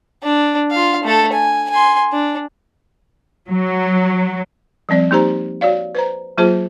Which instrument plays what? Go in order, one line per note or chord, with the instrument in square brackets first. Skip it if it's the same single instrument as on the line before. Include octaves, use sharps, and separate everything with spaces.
[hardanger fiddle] D4
F4 F5
A3 A4
G#5
G#5 C6
D4
[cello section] F#3
[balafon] F3 G3 C4 D5
A#3 D#4 G4 C5 A#5
F#4 C#5 D5 F5
B4 C5 A#5
F#3 A#3 F4 G#4 C5 A5